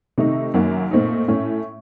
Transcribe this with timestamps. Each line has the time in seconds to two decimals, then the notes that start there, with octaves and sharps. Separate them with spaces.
0.18 C3 D#3 A3 D#4
0.54 F#2 D#3 F#3 A#3
0.91 A#2 A3 C4 D#4
1.28 A2 A3 C#4